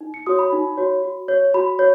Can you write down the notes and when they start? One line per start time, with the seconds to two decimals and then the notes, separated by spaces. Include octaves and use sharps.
0.01 D#4
0.14 C#7
0.26 F#4 C#5 D#6
0.39 B5
0.53 D#4
0.77 F#4 C#5
1.03 F#4
1.28 C#5
1.54 F#4 B5
1.79 C#5